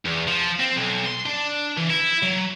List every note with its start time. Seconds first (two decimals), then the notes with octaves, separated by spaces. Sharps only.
0.06 E2
0.28 F3
0.60 C4
0.76 B1
1.06 C6
1.26 D4
1.77 E3
1.90 E4
2.23 F#3